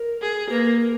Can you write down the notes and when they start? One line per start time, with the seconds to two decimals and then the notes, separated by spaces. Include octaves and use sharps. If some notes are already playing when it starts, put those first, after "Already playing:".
Already playing: A#4
0.22 G#4
0.50 A#3 B4
0.64 A#4
0.79 A#4